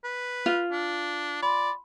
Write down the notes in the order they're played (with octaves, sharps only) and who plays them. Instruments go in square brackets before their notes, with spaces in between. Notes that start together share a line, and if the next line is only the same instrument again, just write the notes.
[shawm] B4
[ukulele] F4
[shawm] D4
[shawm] D5 [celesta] B5 C6